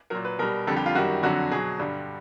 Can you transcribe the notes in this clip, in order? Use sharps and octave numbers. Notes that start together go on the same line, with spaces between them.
A#2 F#3 A#4
B4
B2 G3 A#4
F2 D3 G3 A4
G4
F4
F#2 D#3 G3 F#4
F2 D3 F#3 F#4
B2 F#3 G#4
G2 D3 G3